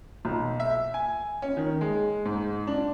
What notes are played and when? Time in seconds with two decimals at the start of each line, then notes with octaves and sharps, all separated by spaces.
0.25 B1
0.60 E5
0.94 G#5
1.42 C#4
1.57 D#3
1.81 G#3
2.25 G#2
2.67 D4